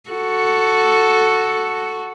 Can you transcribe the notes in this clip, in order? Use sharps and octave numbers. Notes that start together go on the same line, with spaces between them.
F#4 A4